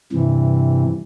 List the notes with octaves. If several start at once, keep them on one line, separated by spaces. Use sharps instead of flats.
G2 C3 E3